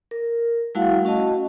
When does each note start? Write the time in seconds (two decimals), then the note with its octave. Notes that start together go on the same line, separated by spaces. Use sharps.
0.11 A#4
0.75 G3 A3 E4 F#4 F5 F#5
1.05 C#4 F#4 D#5 A5